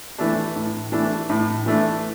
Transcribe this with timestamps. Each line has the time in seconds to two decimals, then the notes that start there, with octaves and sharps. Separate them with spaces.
0.18 E3 A3 D4
0.56 A2
0.92 E3 A3 D4
1.29 A2
1.66 E3 A3 D4